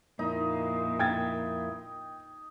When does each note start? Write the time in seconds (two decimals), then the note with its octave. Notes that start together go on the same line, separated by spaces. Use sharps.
0.19 F2 A#2 A#3 D#4 E4
0.99 G5 G#6 A6